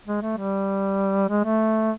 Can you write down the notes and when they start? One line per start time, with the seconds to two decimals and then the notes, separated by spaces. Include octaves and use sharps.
0.06 G#3
0.22 A3
0.37 G3
1.29 G#3
1.44 A3